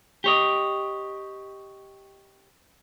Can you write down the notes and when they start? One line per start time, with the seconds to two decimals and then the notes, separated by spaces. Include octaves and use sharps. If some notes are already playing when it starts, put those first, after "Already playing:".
0.24 G4 C#5 D#5